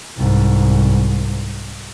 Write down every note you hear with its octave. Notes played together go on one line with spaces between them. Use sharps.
C2 G#2